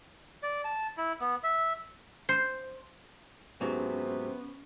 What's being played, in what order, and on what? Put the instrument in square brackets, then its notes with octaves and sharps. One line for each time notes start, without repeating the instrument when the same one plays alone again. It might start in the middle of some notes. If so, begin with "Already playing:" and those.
[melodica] D5
A5
E4
B3
E5
[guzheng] C5
[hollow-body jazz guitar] G#2 F#3 [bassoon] C3 [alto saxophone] B3 [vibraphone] C#4